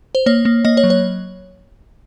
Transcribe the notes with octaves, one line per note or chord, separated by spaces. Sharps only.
C5
A#3 C#5
A#3
A#3 D#5
C#5
F#3
C#5